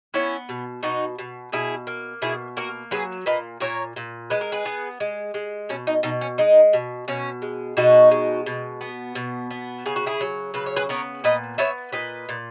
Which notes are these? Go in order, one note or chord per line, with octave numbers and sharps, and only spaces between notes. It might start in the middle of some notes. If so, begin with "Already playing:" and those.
B3 C#4 E4
B2
B2 D#4 F#4
B2
B2 E4 G#4
A#3
B2 E4 G#4
A#3 F#4 A#4
F#3 G#4 B4
A#2 B4 D#5
A#2 A#4 C#5
A#2
G#3 B4
A#4
G#4 B4
B3
G#3
G#3
B2 C#4
D#4
B2 D#4
C#4
G#3 D#4
B2
B2 C#4
G#3
B2 D#4 F#4
G#3
B2
B3
B2
B3
C#3 G#4
F#4
E4 G#4
F#3
C#3 B4
C#5
G#4 B4
B3 A#4 C#5
A#2 B4 D#5
B3 C#5 E5
A#2 B4 D#5
A#2